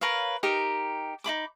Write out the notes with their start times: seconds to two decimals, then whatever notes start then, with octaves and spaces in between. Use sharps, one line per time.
0.01 A#4 B4 C#5 F5
0.43 D#4 G4 A#4
1.24 D#4 F4 B5 D6